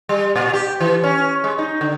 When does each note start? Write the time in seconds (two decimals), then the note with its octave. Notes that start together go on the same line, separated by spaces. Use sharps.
0.09 G3
0.36 A#2
0.53 G4
0.80 E3
1.04 C#4
1.44 G#3
1.58 D#4
1.81 D3